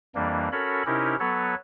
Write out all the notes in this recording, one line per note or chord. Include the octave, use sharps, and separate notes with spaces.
F2 E3 G3 A#3 D4
C#4 F#4 A4 A#4 C#5 B5
C3 C#4 D#4 E4 G4 A#4
F#3 B3 A4 B4 C#5